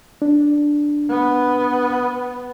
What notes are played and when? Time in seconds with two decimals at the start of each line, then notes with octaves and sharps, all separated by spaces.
0.22 D4
1.10 B3